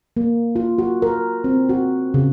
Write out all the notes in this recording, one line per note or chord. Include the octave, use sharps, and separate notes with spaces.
A#3
F4
F#4
A#4
C4
F#4
C#3